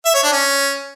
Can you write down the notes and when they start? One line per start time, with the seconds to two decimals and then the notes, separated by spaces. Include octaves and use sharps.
0.05 E5
0.14 C#5
0.23 D4
0.32 C#4